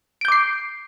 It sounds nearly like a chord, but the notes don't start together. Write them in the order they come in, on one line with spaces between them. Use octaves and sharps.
D7 G6 D6 C7